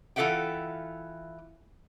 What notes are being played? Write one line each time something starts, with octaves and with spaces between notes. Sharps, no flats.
E3 F4 A4 E5 F#5 G5